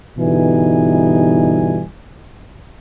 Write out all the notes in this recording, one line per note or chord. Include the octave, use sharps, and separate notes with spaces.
G1 B2 E3 G3 D#4 G#5